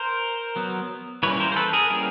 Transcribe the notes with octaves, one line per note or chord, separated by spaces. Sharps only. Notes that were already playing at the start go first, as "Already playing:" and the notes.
Already playing: A#4 C5
F#3 B3
E3 G3 A#3 C#4 B4 C#5
A#4 C5
C5
A4 B4
G#4 A#4
E3 G3 A#3 C#4 G#4 A#4